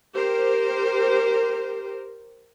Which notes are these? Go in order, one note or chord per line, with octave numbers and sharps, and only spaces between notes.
G4 A#4 C5